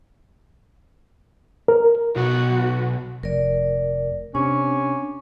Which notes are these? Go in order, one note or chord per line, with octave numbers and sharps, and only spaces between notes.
A#4
B1 B2 F#4
F1 A#4 D5
C3 C#4 D4